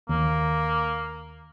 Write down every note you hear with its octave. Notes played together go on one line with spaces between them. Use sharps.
D#2 A#3